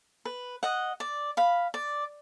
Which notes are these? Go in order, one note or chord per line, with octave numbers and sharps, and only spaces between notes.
B4
D#5 F#5
D5
F5 B5
D5